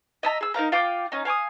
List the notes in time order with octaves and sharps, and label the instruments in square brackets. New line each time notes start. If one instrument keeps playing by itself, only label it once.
[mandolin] D#5 E5 A5 A#5
G#4 E6
D#4 A#4 F5 A#5
F4 F5 G5 D6
C#4 D#4
F5 G#5 D6 D#6